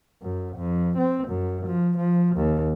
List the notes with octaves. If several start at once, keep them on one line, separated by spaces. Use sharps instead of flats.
F#2
F2
C4
F#2
F3
F3
D#2